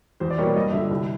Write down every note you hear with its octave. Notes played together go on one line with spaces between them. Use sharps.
E2 C5
D5
B2 G3 A#3 C#5
G2 D#5
D3 F3 E5
C2